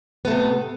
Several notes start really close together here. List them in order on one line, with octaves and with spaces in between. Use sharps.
B3 A3 C3